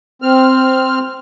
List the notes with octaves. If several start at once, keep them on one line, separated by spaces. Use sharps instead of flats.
C4 F6